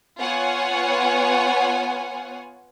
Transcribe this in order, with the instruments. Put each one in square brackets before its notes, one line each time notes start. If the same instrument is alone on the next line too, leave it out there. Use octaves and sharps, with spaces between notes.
[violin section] B3 F4 C#5 F#5 G#5